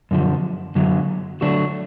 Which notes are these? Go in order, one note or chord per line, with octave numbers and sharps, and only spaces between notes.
F#2 D3 F3
F#2 D3 F#3
D3 F#3 A3 D4 F#4